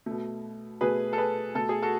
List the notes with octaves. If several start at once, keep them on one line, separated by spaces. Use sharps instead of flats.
B2 A3
B2 A3 G#4 B4
A4
G#4 B4
B2 A3 A4
G#4
F#4 A4